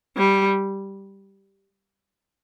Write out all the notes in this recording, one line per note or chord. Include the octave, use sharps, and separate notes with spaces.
G3